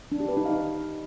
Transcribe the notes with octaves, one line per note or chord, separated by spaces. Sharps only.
D4
G4
B4
D#4
F5